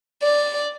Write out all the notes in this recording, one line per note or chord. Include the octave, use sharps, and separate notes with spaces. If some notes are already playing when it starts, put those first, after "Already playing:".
D5